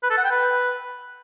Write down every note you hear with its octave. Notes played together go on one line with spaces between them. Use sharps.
B4
A4
F#5
G5
B4